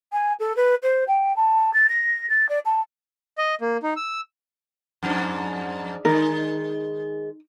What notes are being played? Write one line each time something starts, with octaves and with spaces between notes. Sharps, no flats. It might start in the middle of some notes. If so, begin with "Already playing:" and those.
G#5
A4
B4
C5
G5
A5
A6
A#6
A6
D5
A5
D#5
A#3
D#4
E6
F2 G#2 D4
D#3 G#3 D#4 A#4